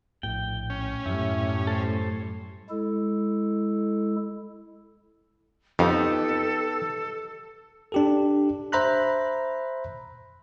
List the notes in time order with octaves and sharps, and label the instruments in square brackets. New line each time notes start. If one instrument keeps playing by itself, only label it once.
[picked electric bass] A#1 A2 [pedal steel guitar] G5
[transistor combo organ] C#4
[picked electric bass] F#2 [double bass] A2 G3 [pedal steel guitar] E4
[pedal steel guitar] A4 C5
[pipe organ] G#3 E4 A4
[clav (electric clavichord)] F2 [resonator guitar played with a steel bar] B3 D#4 G4 [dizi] A4
[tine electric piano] D4 G4 A4
C5 E5 A#5 B5 F#6